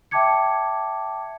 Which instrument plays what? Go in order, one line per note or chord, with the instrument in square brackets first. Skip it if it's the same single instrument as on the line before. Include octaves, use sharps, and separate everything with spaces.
[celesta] E5 G5 A5 D6 G#6 C#7